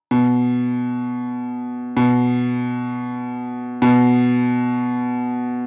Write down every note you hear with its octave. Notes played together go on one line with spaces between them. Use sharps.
B2
B2
B2